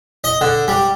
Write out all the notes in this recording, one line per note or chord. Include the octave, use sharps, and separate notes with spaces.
D#5
D3
G3